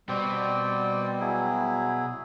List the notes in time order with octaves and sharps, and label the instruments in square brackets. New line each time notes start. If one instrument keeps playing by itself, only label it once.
[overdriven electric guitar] B2 [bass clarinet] G3 [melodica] C4 D5 G5
[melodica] F#3 E4 G#4